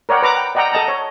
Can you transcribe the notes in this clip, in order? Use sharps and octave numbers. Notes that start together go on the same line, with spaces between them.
A#4 C#5 D5 F#5 G5
B4 A#5 D6
G5
D5 D#5 F#5 G5 A#5
A4 D#5 A5 A#5
C#5